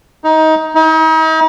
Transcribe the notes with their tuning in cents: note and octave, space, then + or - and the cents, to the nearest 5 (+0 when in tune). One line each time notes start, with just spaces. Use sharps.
D#4 +20
D#4 +40